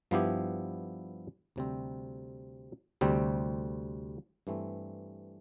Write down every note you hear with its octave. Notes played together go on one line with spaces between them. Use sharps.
G2 F3 B3 E4 G4
D2 C3 G3 C4
D2 C3 G3 C4
G2 E3 A3 C4